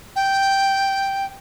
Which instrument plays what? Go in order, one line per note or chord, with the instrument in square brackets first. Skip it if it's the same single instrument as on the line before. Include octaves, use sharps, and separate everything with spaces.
[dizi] G5